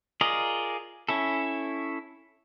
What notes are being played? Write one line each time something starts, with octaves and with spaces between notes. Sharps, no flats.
F4 G#4 A#4 D5 D#5
C#4 E4 A4